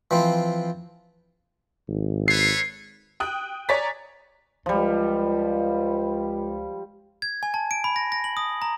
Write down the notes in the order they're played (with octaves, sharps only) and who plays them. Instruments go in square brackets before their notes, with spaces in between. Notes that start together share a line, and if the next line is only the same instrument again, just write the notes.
[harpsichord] E3 F3 C4
[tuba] G#1
[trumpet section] A4 B4 C#5 [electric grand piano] C7
[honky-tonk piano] G5 D#6 F#6
C#5 D5 G#5 A#5 A6 B6
[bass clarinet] C#2 [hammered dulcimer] F3 G3
[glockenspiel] G#6
G#5
A5
D7
B5
A#6
A#6
F#7
D#6
A#5